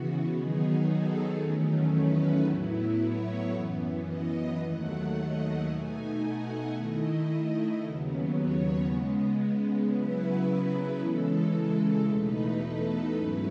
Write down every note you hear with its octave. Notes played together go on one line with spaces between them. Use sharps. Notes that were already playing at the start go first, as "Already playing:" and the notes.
Already playing: C#3 E3 B3 F#4
D#3 F#3 B3 D#4 G#4
A4
E2 D#3 F#3 A3 C#4
B4
A2 F#3 B3 E4
C#5
F#2 E3 B3
D#5
D#2 D#3 F#3 A3 F#5
D#5
B2 A3 D#4 G#5
F#5
D#3 A3 E4 D#5
D#5
D#2 C#3 F#3 B3
C#5
C#3 G#3 B3
C#3 F#3 B3 E4 B4
B4
C#3 E3 G#3 A4
A4
E2 B2 A3 D#4 B4
A4
G#2 F#3 C#4 E4 B4